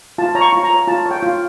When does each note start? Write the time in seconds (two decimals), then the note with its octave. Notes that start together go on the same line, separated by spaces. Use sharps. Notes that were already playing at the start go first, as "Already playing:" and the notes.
0.18 F4 A5
0.35 C#5 A#5
0.41 C#6
0.53 F4
0.64 A#5
0.70 C#5
0.88 F4 A5
1.06 C#5 G5
1.22 F4